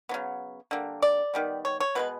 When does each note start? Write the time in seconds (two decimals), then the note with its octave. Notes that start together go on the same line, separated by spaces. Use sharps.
0.09 C#3 F#3 B3
0.71 D3 G3 A#3
1.02 D5
1.34 D#3 G3 B3
1.65 C#5
1.80 C#5
1.95 B2 G#3 B3 B4